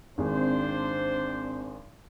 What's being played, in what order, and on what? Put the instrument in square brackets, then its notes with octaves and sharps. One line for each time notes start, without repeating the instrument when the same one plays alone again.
[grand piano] G#1 G#3 [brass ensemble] C4 D4 C5